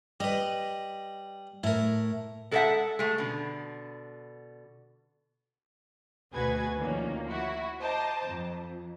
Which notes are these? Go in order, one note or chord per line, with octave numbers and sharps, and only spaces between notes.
G3 B4 D#5
A2 E4 A#4
G#3 A4 C#5 D#5 E5 F#5
G#3 A3
B2 D3
D2 B2 F#4 G#4 B4 G#6
D2 D#3 F3 A#3 C#4
E4 F#4
C5 D#5 A5 A#5 D6
F2